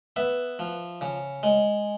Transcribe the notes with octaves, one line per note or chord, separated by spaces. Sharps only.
B3 E5
F3
C#3
G#3